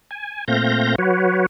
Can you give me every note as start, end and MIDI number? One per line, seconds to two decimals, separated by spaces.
0.11 0.45 80
0.48 0.95 46
0.48 0.95 57
0.48 0.95 60
0.48 0.95 77
0.48 0.95 91
0.48 0.95 94
0.98 1.46 54
0.98 1.46 66
0.98 1.46 71
0.98 1.46 73